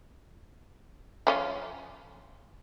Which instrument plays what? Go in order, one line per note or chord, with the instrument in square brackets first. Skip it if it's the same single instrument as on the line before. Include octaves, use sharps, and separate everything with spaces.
[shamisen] F3 C#4 F4